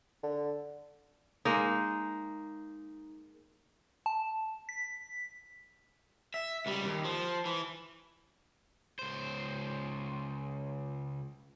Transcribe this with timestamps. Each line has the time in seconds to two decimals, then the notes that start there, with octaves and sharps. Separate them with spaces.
0.23 D3
1.45 G#3 A#3 D#4
4.06 A5
4.69 B6
6.34 E5
6.66 C#2 G3
6.86 D#2
7.05 F3
7.45 E3
8.99 C#2 C5